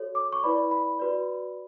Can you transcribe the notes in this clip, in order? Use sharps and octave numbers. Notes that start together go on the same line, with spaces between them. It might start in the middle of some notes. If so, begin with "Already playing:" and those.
Already playing: F#4 A4 C#5
D6
C#6
E4 B4 D5 B5
B5
F#4 B4 D5